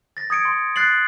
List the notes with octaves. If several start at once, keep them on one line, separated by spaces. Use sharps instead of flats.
A6 A#6
D#6 G#6 C#7 D7
C6
F#6 A6 C7 F#7